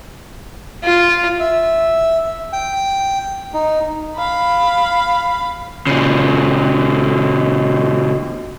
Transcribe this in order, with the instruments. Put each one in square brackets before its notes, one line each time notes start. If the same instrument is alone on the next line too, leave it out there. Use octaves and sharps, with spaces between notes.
[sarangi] F4
[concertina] E5
G5
D#4
[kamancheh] F5 B5
[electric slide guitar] A#2 C#3